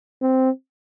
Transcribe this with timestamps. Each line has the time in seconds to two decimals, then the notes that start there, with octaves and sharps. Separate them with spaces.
0.22 C4